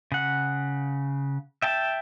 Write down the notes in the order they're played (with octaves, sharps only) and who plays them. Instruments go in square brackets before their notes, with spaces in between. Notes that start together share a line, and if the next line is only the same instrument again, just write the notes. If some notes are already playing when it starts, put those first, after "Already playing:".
[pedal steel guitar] C#3 F#5
E5 G5 A5